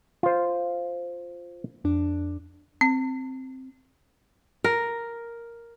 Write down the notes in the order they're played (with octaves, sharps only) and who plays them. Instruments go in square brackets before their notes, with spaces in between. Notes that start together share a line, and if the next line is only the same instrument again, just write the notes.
[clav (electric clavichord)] F4 C5
[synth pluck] F2 D4
[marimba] C4
[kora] A#4